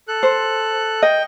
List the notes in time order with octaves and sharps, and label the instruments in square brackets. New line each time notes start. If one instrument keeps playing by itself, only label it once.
[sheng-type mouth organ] A4 F#6
[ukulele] C5
[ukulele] D#5 [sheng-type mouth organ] G5